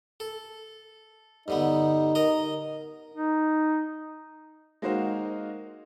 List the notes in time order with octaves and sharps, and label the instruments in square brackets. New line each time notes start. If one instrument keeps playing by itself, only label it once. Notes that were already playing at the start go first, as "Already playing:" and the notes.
[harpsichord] A4
[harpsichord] G2 D3 B3 [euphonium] D#4
[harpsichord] A#4 D#5 A#5
[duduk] D#4
[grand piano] G#3 A#3 D#4 F#4 C5 F5